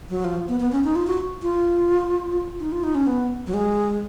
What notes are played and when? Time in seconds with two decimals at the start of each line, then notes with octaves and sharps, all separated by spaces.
0.10 F#3
0.24 F3
0.48 B3
0.60 B3
0.72 C#4
0.84 D#4
0.96 F4
1.07 F#4
1.42 F4
2.60 D#4
2.72 F4
2.84 D#4
2.95 C#4
3.07 B3
3.47 F#3
3.54 G#3